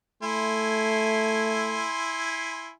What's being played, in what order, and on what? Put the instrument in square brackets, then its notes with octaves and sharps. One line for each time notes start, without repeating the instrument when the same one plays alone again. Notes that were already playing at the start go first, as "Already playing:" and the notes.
[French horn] A3 [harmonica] E4 G#5 C6